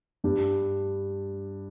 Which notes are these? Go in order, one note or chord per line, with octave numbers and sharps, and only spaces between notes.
G2 G3 D4 G4